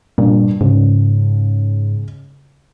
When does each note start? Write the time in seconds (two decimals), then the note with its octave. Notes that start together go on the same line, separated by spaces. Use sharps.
0.18 G2 A#2
0.61 G#2 C#3